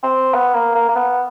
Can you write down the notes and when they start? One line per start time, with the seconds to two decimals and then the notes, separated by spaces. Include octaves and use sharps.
0.04 C4
0.34 B3
0.54 A#3
0.75 A#3
0.89 A#3
0.96 B3